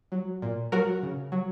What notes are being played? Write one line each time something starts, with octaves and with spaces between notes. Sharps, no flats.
F#3
A#2
F#3 F#4 A#4
C#3
F#3